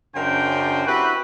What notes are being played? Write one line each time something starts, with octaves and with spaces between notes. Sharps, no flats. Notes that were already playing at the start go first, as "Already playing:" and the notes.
F#2 C#3 D4 A#4 C5 G5
C4 E4 F#4 G4 B4